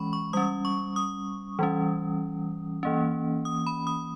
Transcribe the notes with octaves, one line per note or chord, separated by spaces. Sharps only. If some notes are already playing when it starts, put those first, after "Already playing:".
Already playing: E3 G#3 C#4 B5 C#6
C#6
G3 C#4 D#6
C#6
D#6
E3 G3 C#4
E3 A#3 C#4
D#6
B5
D#6